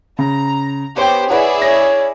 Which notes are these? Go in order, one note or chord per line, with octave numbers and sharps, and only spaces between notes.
C#3 A#5
B3 G4 C5 C#5 G5
E4 G#4 B4 C#5 D5 F#5
C#5 A#6